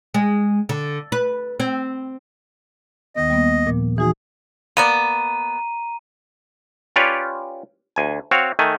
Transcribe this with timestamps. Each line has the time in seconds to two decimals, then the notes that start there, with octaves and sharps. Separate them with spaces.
0.14 G#3
0.69 D3
1.12 B4
1.60 C4
3.16 D#2 D#3 B3 D#5
3.30 G3 A#3 B3
3.66 A#2 F3 B3
3.98 E3 D#4 F#4 G#4
4.77 A#3 B3 D5 A#5 D#7
6.96 C#4 F4 G4 B4 C#5 D5
7.96 D2 G#5
8.31 C4 F#4 C#5 F5
8.59 D#3 A3 G#5